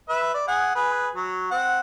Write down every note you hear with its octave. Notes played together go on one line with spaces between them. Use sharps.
B4 E5
D5
G#4 F#5 G#5
G#4 B4
F#3
C4 F#5